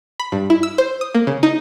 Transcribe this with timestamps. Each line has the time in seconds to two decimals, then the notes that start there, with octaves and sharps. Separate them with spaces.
0.20 B5
0.32 G2
0.50 E4
0.63 E6
0.78 C5
1.01 D#6
1.14 A#3
1.27 C#3
1.43 D#4